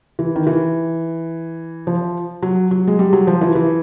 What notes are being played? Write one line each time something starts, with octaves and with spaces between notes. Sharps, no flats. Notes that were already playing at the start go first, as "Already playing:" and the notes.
E3
D#3
E3
F3
F#3
F#3
G#3
G3
F#3
F3
E3
E3